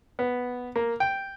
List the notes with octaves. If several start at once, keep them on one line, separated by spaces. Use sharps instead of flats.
B3
A#3
G5